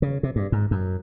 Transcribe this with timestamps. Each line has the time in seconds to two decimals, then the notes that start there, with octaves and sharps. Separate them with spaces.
0.02 C#3
0.23 C3
0.36 G2
0.52 G#2
0.71 F#2